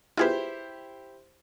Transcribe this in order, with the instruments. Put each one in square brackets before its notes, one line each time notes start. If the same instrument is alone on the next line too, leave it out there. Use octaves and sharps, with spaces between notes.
[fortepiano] E4 G4 C5 [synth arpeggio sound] F4 G#4 B4